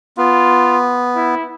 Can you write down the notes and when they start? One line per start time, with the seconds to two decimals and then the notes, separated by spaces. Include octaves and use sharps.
0.17 B3 F4
1.16 E4